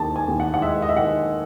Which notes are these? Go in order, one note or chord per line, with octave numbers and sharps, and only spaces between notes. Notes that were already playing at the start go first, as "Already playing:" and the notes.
Already playing: D#2 D#3 A5
G#5
D#2
F#5
F#5
G#3 E5
D#5
E5
D#3 F#5